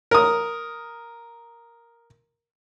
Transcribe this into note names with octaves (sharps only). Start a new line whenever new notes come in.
A#4 D#6